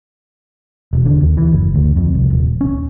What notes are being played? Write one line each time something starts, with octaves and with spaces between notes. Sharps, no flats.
E1
D3
D#2
E3
F#1
D2
F2
C2
D#1
C#4